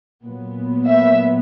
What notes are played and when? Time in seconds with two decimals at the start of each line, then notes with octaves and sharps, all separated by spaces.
0.24 A#2 F#3 B3
0.87 E5